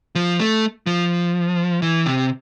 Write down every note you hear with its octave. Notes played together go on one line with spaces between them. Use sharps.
F3
A3
F3
E3
C3